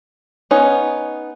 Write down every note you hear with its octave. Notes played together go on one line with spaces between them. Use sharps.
B3 C#4 D#4 C#5